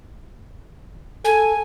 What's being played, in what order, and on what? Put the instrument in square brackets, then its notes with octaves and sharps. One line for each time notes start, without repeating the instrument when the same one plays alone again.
[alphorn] A4 [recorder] G#5